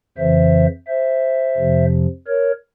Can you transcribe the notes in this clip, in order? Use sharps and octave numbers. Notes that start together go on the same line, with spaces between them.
F2 C#3 E3 C5 E5
C5 E5
F2 C3 F3
A#4 C#5